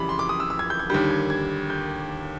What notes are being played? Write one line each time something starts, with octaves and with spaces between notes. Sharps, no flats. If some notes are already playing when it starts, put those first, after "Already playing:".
Already playing: F2 C#3 E3 G3 B5 D6
C6
D6
D#6
E6
E6
G#6
G6
G#6
D#2 D3 G3 G6
G#6
G#6
G6